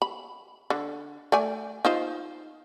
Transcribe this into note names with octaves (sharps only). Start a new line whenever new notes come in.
B5
D3
A3 D5 G#5
D#4 F4 C5